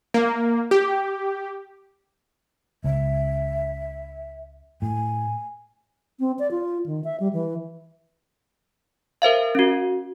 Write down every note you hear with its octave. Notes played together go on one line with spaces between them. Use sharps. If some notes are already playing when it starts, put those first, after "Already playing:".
A#3
G4
C#2 E5
A2 G#5
C4
D5
F4
D#3
E5
G3
E3
A#4 C5 E5 F5
C#4 F#4